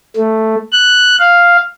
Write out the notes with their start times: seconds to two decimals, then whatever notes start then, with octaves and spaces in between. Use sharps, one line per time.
0.17 A3
0.72 F#6
1.19 F5